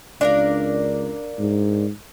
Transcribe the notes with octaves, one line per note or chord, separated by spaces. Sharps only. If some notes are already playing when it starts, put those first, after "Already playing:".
C#2 D4 A#4 F5
G#2